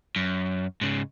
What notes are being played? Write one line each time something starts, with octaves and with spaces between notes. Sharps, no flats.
F#2
G#2 C#3